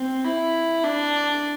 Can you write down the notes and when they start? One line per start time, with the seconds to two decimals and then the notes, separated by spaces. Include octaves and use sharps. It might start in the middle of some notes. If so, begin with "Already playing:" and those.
Already playing: C4
0.25 E4
0.84 D4